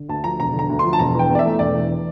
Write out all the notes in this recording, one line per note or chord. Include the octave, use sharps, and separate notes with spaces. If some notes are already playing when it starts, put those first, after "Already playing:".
Already playing: D3
D2 A5
F3 A#5
E1 A#5
D3
A#5
D2
C6
F3
A5
E1 A#5
E3 G5
E2
D5
E5
A3
E1 D5
E3